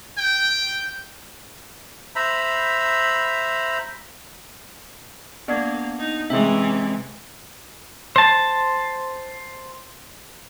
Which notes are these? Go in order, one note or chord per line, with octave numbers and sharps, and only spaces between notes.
G5
C5 E5 A#5 B5
A#3 B3 D4 D5 G#6
D#4
C3 E3 G#3 C#4 E5
C5 A5